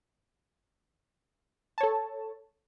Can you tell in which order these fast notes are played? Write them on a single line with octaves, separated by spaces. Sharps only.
A5 C#5 A4